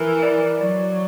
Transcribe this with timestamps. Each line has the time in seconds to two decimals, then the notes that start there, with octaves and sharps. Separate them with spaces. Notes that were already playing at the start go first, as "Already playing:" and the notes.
Already playing: E3 A#4
0.23 D5
0.60 F#3 D5